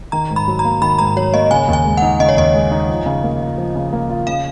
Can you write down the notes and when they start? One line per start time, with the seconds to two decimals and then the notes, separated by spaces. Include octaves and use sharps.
0.12 D#3 A#5
0.30 G#2
0.36 B5
0.48 F#3
0.59 A#5
0.65 A#3
0.82 D#3 B5
0.99 G#2 A#5
1.16 F#3 C#5
1.34 A#3 D#5
1.51 C#3 G#5
1.68 D#2 G#5
1.85 G#3
1.97 D#4 F#5
2.20 C#3 D#5
2.29 C#5
2.37 D#2 D#5
2.54 G#3
2.71 D#4
2.89 F3
3.06 C#3
3.23 A#3
3.41 F4
3.58 F3
3.75 C#3
3.93 A#3
4.10 F4
4.27 C#3 F5